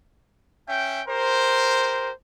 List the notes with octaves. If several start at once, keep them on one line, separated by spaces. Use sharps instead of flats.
C#4 E5 G5
G4 A#4 C5